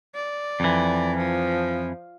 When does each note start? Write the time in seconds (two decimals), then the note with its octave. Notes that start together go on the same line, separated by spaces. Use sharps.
0.15 D5
0.60 F2 E3
1.17 F3